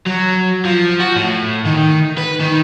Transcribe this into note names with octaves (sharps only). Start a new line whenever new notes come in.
F#3
F3
F#4
A2
D#3
B4
D#3